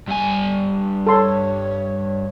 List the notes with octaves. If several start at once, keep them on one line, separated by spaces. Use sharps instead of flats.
G2 G#5
A4 C#5 C6